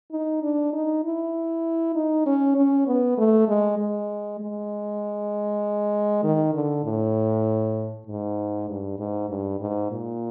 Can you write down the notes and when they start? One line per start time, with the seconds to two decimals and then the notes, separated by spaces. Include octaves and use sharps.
0.12 D#4
0.42 D4
0.73 D#4
1.04 E4
1.96 D#4
2.26 C#4
2.56 C#4
2.87 B3
3.18 A3
3.48 G#3
3.78 G#3
4.40 G#3
6.23 D#3
6.54 D3
6.84 A2
8.07 G#2
8.69 G2
8.99 G#2
9.30 G2
9.60 G#2
9.91 A#2